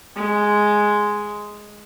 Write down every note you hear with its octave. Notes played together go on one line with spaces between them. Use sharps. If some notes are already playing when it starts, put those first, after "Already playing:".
G#3